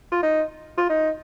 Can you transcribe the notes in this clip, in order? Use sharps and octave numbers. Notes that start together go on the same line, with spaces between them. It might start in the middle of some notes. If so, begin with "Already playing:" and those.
F4
D#4
F4
D#4